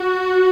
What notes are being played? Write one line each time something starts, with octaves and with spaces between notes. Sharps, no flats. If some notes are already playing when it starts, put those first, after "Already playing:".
Already playing: F#4